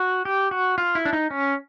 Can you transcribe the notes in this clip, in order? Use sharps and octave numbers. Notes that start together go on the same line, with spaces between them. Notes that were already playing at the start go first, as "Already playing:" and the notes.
Already playing: F#4
G4
F#4
F4
E4
D4
D#4
C#4